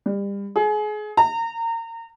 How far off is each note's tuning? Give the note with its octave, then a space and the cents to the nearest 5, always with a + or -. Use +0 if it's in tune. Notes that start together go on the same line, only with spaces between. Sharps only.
G3 +30
G#4 +30
A#5 -30